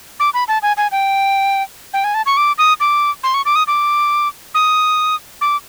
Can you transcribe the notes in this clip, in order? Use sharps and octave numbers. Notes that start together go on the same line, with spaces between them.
D6
B5
A5
G#5
G#5
G5
G5
G#5
A5
C#6
D6
D#6
D6
C6
C#6
D6
D#6
D6
D#6
D6